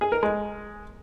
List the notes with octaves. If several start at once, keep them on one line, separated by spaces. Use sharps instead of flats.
G#4
A#4
G#3